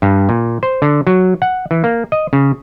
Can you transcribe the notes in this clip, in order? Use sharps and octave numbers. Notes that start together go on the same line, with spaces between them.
G2
A#2
C5
D3
F#3
F#5
E3
A#3
D#5
C#3